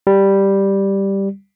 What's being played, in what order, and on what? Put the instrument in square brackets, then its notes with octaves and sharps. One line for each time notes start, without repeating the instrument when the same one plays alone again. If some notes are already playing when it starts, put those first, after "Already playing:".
[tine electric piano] G3